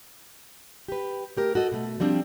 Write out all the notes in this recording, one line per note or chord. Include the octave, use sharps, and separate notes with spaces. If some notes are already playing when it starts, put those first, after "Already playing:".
G4 B4
A3 G4 A#4
F#4 A4 D#5
B2 A3
F3 G3 C4 D4